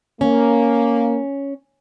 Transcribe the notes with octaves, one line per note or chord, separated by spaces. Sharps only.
A#3 C#4